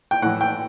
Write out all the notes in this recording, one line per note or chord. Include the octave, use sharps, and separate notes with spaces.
G5
A2 E3 F#5
G5